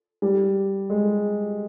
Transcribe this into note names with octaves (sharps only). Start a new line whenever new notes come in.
G3
G#3